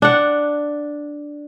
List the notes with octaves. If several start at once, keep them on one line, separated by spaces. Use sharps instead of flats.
D4 F#5